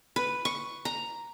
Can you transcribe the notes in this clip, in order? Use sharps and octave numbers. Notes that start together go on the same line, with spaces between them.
B4
C#6
A#5